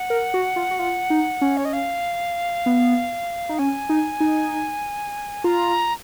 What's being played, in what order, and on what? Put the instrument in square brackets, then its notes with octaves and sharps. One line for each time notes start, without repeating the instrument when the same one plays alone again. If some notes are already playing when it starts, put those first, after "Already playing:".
Already playing: [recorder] F#5
[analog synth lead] A#4
F#4
F4
F#4
F4
D#4
C#4
[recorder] C#5
D#5
F5
[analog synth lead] B3
D#4
[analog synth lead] C#4 [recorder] G#5
[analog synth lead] D#4
D#4
[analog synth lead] F4 [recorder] A#5